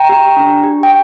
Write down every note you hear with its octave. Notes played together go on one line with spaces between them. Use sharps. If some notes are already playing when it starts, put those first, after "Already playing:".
Already playing: G5 A#5
G4
D4
G4
G5